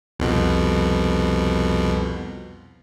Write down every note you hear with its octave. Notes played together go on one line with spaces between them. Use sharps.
C2 F2 B2